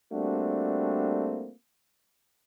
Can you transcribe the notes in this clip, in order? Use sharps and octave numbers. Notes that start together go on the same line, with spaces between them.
G3 A3 A#3 C4 D4 F#4